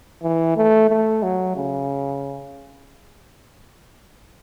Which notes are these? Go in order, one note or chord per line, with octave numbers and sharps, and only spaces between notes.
E3
A3
A3
F#3
C#3